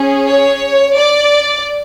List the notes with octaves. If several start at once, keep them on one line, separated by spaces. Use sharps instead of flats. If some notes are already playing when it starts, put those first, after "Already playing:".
Already playing: C#4 G#4
C#5
D5